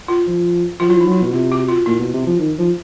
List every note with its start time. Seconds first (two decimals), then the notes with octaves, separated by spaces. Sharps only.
0.08 F4
0.27 F3
0.80 F3 F4
0.87 F#3
0.90 F3 E4
1.01 D#4
1.06 F#3
1.12 E4
1.22 B2
1.33 C3 F4
1.52 F#4
1.69 F4
1.86 A#2 E4
2.00 B2
2.13 C3
2.26 F3
2.40 D#3
2.58 F3